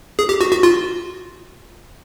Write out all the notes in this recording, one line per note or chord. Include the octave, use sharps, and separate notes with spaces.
G#4
G4
F#4
F#4
F4